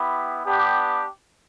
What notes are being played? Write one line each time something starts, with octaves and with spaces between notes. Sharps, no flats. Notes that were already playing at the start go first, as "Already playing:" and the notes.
Already playing: B3 E4 G4
B3 D4 G4